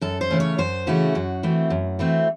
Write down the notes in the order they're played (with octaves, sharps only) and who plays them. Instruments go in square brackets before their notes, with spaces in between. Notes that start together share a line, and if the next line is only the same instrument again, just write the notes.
[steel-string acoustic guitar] F#2 A4
C5
C#3 E3 A3 C#4
C#5
F#2 C5
C#3 E3 A3 C#4 F#4
F#2
E3 A3 C4
F#2
E3 A3 C4